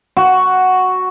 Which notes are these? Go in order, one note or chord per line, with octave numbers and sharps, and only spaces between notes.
F#4